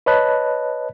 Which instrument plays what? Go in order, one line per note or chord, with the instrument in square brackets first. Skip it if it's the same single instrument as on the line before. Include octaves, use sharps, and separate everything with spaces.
[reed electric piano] B4 C#5 D#5 A5 B5 F#6